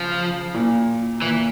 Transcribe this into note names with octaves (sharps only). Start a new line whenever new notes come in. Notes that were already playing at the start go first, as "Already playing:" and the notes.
Already playing: C#3 F3
A#2
A#2 E3